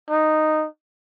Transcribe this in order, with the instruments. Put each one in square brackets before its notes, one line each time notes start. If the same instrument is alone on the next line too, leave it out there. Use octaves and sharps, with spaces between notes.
[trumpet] D#4